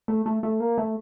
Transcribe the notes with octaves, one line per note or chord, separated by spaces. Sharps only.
A3
A3
A3
A#3
A3